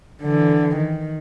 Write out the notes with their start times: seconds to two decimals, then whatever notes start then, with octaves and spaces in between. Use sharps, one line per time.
0.22 D3 E3
0.76 D#3